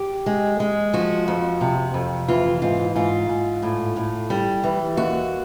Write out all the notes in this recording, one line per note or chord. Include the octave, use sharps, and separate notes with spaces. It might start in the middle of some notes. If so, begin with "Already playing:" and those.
Already playing: G4
G#3
G#3
F3 F#4
F2
C3
F2
E3 F4
G#2 F4
G#2 F4
G#2
A2
A2
G3
E3
D#2 F#4